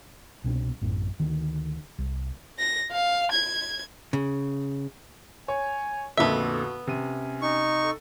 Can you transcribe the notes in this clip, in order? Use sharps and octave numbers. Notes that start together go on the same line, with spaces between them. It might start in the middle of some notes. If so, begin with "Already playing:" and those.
C2 B2 C4 D4
A1 F#2 A2
D2 D#3
C2
A#6
F5
G#6
C#3
C#5 G#5
F2 A#2 D3 B3 F#4 E5
C3 C#4 D#7
D#4 C#6
A4